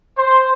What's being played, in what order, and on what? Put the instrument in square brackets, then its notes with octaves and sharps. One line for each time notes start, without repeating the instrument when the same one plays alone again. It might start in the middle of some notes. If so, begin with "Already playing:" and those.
[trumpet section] C5